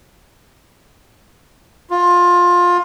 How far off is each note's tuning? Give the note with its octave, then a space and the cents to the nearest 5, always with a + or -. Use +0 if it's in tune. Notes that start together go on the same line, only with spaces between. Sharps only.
F4 +20